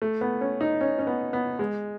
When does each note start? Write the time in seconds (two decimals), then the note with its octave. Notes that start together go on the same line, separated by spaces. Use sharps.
0.02 A3
0.21 B3
0.41 C#4
0.61 D#4
0.81 C#4
0.99 C#4
1.07 B3
1.33 B3
1.59 G#3